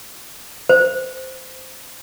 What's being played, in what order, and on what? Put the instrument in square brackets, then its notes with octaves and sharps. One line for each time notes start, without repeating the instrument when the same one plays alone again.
[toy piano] C5